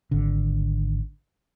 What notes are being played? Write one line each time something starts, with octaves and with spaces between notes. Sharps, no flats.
G#1 D3